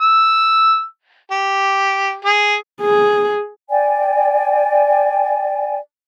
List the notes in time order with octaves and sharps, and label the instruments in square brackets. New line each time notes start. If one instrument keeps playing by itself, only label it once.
[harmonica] E6
G4
G#4
[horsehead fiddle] G#4
[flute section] D5 G5 G#5